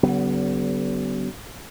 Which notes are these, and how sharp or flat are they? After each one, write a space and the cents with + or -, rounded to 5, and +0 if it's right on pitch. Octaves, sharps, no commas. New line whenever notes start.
D3 -45 F#3 +40 B3 +0